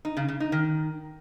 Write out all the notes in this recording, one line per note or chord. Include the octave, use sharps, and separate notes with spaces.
D#4
C#3
C#3
D#4
D#3